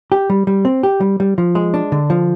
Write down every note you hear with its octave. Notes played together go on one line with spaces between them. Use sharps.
G4
G3
G3
C4
G4
G3
G3
F3
G#3
D4
D3
F3